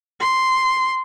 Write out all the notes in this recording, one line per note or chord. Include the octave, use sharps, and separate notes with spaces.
C6